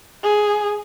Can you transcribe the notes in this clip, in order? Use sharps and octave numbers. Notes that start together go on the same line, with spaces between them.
G#4